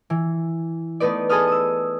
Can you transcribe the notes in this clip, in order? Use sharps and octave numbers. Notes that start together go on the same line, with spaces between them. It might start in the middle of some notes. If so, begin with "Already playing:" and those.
E3
A3 B3 D#4 B4 D5
G#4 A4 B4 D#6 F6
D#6 E6